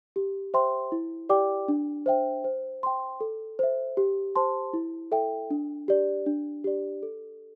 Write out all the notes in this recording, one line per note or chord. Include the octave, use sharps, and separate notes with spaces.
G4
C5 E5 G5 C6
E4
G4 D5 G5 D6
D4
C5 E5 G5
C5
G5 C6
A4
C5 E5
G4
C5 A5 C6
E4
A4 E5 G5
D4
G4 D5
D4
G4 D5
A4